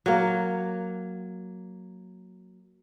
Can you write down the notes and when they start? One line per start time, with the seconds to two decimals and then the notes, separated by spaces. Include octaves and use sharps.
0.06 F#3 A#3